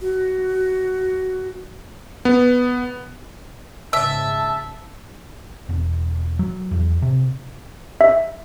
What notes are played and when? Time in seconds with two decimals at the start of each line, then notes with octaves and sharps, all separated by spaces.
0.01 F#4
2.25 B3
3.93 G#2 C#3 E5 A5
5.69 E1
6.39 F#3
6.71 E2
7.02 C3
8.01 E5